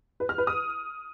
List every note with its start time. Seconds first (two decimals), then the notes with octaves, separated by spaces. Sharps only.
0.20 B4
0.29 F6
0.38 B4
0.47 D#6